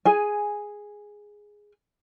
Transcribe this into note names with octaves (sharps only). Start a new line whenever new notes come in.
G#4 G#5